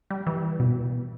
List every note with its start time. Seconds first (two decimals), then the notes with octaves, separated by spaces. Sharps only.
0.10 G3
0.27 E3
0.60 B2